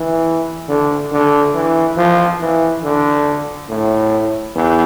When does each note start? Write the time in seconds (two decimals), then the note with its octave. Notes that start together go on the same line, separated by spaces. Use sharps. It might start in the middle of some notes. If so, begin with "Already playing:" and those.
Already playing: E3
0.69 D3
1.12 D3
1.54 E3
1.97 F3
2.41 E3
2.83 D3
3.69 A2
4.55 E2